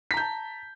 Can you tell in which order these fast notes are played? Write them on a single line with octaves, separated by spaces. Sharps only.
B6 A#5 G6 A5